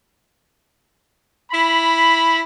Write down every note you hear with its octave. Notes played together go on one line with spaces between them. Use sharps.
E4 B5